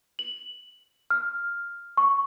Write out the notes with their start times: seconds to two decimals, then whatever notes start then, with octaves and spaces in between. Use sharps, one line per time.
0.19 F#7
1.10 F6
1.97 C#6